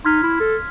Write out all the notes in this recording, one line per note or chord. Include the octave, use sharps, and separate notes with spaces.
D#4 C6 F6 G#6 B6
E4
A4